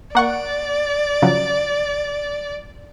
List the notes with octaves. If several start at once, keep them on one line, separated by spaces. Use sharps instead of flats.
A#3 D5 F#5 C#6
C#3 F3 F#3